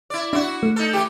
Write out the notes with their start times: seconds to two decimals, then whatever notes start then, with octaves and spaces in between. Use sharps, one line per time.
0.10 E4 D5
0.33 D4 E4 F#4
0.63 A3
0.76 D#4 A4
0.93 E3 G4